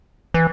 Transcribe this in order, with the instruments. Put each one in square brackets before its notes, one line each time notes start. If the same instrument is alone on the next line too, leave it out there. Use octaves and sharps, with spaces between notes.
[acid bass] E3